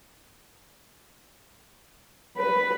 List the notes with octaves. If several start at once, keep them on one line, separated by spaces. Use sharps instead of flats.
B4